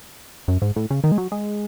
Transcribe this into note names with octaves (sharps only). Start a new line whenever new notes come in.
F#2
G#2
A2
C#3
D#3
G#3
F#3
G#3